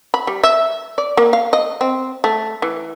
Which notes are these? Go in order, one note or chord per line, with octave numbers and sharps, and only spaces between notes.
B5
G3
E5
D5
A#3
F5
D#5
C4
A3
E3